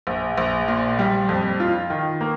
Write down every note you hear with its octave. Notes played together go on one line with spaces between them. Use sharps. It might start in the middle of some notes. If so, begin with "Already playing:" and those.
A#1
A#1
A#2
G3
F2
F4
D#3
A#3